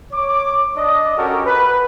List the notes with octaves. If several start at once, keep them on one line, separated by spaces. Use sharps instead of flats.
C#5 D6
D4 D5 D#5
C#4 F#4 G4 A4 A#4
B4